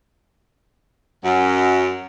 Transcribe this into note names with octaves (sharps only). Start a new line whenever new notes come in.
F#2